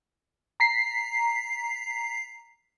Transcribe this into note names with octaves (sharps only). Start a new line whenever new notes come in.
A#5 B6 C7